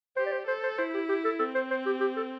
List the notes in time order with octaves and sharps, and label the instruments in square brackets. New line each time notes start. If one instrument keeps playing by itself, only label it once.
[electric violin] G4 [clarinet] C5
[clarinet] D5
C5
[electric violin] A4 [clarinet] C5
[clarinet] C5
[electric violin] E4 [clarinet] C5
[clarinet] G4
G4
A4
[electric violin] C4 [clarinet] A4
[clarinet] C5
C5
G4
G4
A4